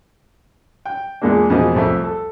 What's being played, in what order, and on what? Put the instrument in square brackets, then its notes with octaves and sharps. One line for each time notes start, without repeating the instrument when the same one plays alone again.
[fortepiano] G5
E2 A#2 G#3 A#3 D4
E2 B2 F3 A#3 D#5
C2 F2 A3 E5
A4